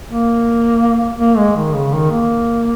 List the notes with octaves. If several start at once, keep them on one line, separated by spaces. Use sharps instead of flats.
A#3
A#3
G#3
D#3
C#3
D#3
A#3